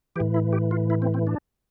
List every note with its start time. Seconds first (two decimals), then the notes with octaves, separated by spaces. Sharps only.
0.16 E3 G4
0.20 A2
0.34 E4
0.53 G4
0.71 F4
0.90 E4
1.02 C4
1.14 C4
1.27 D4